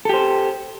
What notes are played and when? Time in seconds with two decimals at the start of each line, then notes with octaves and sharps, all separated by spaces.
0.05 A4
0.09 G4
0.13 C5